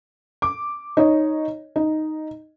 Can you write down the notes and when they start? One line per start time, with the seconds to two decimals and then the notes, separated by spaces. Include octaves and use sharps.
0.42 D6
0.97 D#4 C#5 D#5
1.76 D#4